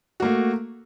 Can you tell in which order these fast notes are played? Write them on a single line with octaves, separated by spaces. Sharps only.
F#4 A#3 A3